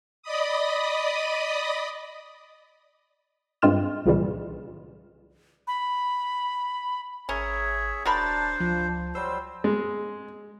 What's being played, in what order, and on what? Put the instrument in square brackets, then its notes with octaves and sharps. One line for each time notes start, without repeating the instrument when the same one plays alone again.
[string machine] D5 D#5 B5 D#6
[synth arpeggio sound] G2 G#3 C4 F4 F6 E7
C2 A#2 C#3 E3 G3
[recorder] B5
[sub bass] G#1 [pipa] C#4 A#4 [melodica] G#4 C#5 E5
[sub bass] D#1 [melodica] D4 C5 [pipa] F#4 A#4 B5 [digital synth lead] A6
[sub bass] C#2 [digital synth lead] F3
[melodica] F#3 G3 E6 [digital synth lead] C5
[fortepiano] G#3